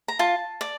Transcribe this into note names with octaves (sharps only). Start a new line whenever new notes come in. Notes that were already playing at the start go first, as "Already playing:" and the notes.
A#5
F4 A5
D5